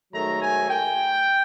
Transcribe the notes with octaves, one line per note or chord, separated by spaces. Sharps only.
G#2 D#3 F#3 A3 A#5
G#5
G5